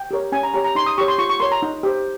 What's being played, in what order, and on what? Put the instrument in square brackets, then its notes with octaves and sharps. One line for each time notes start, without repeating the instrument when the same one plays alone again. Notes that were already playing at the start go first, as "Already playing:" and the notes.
Already playing: [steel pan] G5
G4 A#4 C#5
C#4 G#5
A#5
G4 C#5 A#5
A#5
D#4 C6
D#6
G4 C#5 C#6
C6
F4 C#6
C#6
A#4 C#5 C6
A#5
D#4
G4 C5